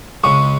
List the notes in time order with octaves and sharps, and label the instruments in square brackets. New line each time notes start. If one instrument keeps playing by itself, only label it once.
[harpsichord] C#2 C#3 G#3 [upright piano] C#6